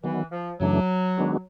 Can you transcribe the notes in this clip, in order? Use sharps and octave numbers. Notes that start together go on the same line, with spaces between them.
D#3 E3 F#3 B3
F3
F#2 C#3 E3 F#3 A3 D4
D#3 G#3 B3 D4 F#4